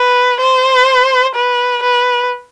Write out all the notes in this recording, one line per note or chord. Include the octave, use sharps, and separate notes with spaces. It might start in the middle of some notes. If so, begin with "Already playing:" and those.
Already playing: B4
C5
B4
B4